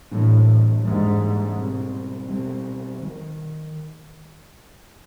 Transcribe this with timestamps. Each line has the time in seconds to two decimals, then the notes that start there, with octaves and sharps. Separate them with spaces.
0.11 A2 E3 G3 A#3 D4
0.84 G#2 E3 G3 A#3 D4
1.56 B2 G3 C4
2.28 B2 G3 C4
3.01 D#3 F#3